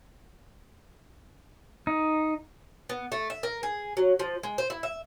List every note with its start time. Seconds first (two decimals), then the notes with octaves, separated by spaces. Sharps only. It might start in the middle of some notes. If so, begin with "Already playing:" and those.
1.87 D#4
2.89 B3
3.12 A3
3.30 E5
3.43 A#4
3.63 G#4
3.97 F#3
4.19 F3
4.43 G#3
4.58 C5
4.70 E4
4.83 E5